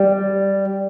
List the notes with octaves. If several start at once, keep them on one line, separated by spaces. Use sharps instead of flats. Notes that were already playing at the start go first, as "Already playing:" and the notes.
Already playing: G3